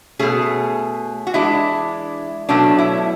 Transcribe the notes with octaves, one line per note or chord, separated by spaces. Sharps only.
B2 A3 C#4 G#4
F#4
E3 G#3 D4 E4
B2 F#3 A3 C#4 D4
E4